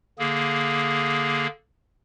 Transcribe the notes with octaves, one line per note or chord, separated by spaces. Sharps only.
D3 A#3 G#4